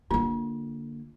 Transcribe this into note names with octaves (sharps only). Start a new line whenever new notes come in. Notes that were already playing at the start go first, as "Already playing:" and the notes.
D3 A#3 F4